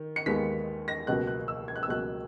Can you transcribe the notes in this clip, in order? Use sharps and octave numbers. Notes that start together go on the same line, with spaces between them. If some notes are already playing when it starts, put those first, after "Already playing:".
Already playing: D#3
C#7
D#2 D#3 G#3 B3 B6
A#6
C#2 B2 F#3 A#3 F#6
F#6
E6
G#6
F#6
E6
C#2 B2 F#3 A#3 F#6